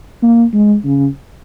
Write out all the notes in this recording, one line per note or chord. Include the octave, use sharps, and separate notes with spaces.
A#3
G#3
C#3